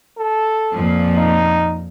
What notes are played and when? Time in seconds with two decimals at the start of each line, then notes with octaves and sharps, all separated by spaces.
0.18 A4
0.72 F2 A#2 F3
1.15 D#4